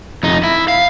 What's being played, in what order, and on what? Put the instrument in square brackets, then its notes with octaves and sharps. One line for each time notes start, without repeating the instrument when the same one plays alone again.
[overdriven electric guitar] F2 D#4
E4
F5